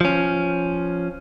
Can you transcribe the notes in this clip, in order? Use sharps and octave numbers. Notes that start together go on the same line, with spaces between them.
F3 C#4